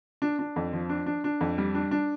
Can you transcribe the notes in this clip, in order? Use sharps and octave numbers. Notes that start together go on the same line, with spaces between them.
D4
D4
F2
F3
D4
D4
D4
F2
G3
D4
D4